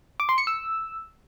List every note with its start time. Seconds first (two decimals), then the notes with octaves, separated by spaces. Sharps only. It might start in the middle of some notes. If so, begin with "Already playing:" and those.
0.20 D6
0.29 C6
0.38 C#7
0.47 E6